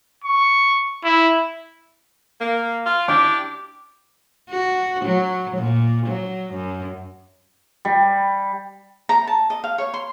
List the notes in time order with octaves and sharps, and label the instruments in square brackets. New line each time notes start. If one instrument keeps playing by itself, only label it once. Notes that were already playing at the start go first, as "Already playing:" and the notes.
[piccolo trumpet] C#6
E4
[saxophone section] A#3
F4
[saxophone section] D4 E4 G4 [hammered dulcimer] D6
[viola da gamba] F#4
F#3
A#2
F#3
F#2
[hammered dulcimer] G3
[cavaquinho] A#5
A5
D#5
F5
C#5
C6